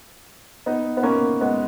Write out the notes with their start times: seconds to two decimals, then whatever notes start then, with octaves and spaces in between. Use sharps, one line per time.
0.66 B3 D#4
0.97 B3
1.03 A#3 C#4
1.41 G#3 B3